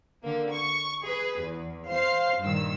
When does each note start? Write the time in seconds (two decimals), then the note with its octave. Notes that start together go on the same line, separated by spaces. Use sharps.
0.23 D3 A#3
0.53 C#6
1.06 G#4 B4
1.43 E2
1.90 C5 F5 C7
2.42 G2 A#2 D#3 E6